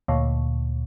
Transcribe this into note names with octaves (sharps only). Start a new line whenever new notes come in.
D2 A#2